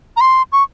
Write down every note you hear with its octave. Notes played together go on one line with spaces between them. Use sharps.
A#5
C6
C#6